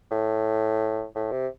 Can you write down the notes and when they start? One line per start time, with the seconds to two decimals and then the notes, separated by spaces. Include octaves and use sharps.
0.11 A2
1.15 A2
1.32 C3